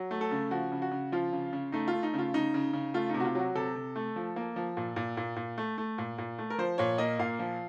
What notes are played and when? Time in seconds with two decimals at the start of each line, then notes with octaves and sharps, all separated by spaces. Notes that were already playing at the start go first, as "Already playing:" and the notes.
Already playing: F#3
0.11 A3
0.21 A4
0.31 C#3
0.51 F3 F#4
0.72 C#3
0.82 F#4
0.91 C#3
1.12 F3 F4
1.33 C#3
1.53 C#3
1.72 A3 D#4
1.88 F4
1.93 A3
2.03 D#4
2.14 C#3 F4
2.34 C#3 D#4
2.54 C#3
2.73 C#3
2.94 A3 F4
3.09 C3 D#4
3.20 F#4
3.25 F4
3.35 F#3 F#4
3.55 C3 A4
3.75 C3
3.96 A3
4.16 F3
4.36 A#3
4.56 F3
4.77 A#2
4.96 A#2
5.17 A#2
5.36 A#2
5.58 A3
5.78 A3
5.98 A#2
6.18 A#2
6.38 A3
6.50 A#4
6.58 F3 C5
6.78 A#2 C#5
6.98 A#3 D#5
7.19 A#2 F5
7.39 F3